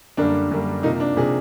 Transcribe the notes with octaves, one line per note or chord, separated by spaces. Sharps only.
F#2 D3 G3 A#3 D4
F#2 D3 G3 A#3
C3 F3 A#3 D#4
D4
C3 F3 A#3 G#4